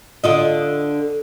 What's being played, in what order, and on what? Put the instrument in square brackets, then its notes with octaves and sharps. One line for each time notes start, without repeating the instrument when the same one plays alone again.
[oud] D3 F4 D#5